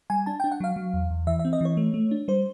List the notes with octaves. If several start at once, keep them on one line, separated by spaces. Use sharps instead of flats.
G3 G#5
D4 A5
G5
D4
F#5
F#3 F5
F#3
E2
E2
E3 E5
E5
C4
D#5
E3 C#5
A3
A3
D4
G3 C5